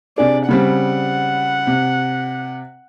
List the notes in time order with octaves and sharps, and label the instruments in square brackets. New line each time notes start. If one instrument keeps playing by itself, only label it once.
[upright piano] C3 D4 G#4 [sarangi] D5
[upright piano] C#3 G3 C4 [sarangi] F#5
[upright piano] C3